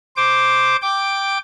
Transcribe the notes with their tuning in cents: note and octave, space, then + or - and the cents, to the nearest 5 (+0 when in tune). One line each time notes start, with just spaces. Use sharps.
C5 +0 D6 +0
G5 +0 D6 +0